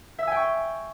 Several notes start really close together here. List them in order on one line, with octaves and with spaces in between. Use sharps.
E5 E6 G#5 G5 C#6